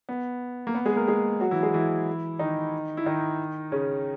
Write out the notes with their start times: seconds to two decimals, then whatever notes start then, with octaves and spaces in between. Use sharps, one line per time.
0.09 B3
0.67 A#3
0.75 B3
0.85 G#3 G#4
0.96 A#3 A#4
1.07 G#3 G#4
1.40 F#3 F#4
1.51 E3 E4
1.63 G#3 G#4
1.74 E3 E4
2.39 D#3 D#4
2.97 E4
3.06 D#3 D#4
3.72 C#3 C#4